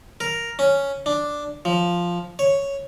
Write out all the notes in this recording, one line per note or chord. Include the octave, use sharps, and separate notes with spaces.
A#4
C#4
D4
F3
C#5